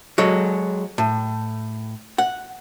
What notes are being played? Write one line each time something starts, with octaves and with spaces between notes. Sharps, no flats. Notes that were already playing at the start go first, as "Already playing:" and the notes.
F#3 G#3 A4
A2
F#5